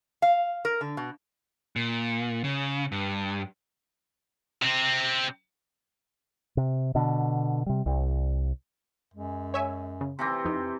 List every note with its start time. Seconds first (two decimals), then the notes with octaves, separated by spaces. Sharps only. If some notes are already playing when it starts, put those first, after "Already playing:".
0.22 F5
0.65 A#4
0.81 D3
0.97 B2
1.76 A#2
2.44 C#3
2.92 G2
4.62 C3 C4
6.57 C3
6.95 B2 D3
7.66 C3 G3
7.86 C2
9.14 F#2 G#3
9.54 C#5 E5 G#5
10.01 C#3
10.19 C3 E3 C4 C6
10.45 F2 D#4